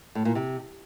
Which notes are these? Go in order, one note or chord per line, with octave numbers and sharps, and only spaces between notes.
A2
A#2
C3